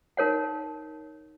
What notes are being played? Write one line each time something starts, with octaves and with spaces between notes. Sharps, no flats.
D#4 A#4 C#5 F#5